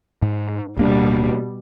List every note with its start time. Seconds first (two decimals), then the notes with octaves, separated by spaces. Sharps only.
0.22 G#2
0.77 D1 B2 G3 A#3 D4